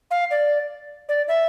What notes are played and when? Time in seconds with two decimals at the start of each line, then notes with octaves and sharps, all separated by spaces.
0.11 F5
0.31 D5
1.09 D5
1.28 E5